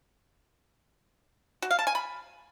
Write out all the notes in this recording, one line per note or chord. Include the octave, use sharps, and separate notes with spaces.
F#4
F5
A5
G#5
B5